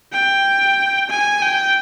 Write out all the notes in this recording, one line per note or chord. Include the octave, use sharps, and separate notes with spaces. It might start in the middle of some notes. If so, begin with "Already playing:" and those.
G5
G#5
G5